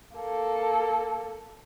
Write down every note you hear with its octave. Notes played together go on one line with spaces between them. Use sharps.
A#3 A4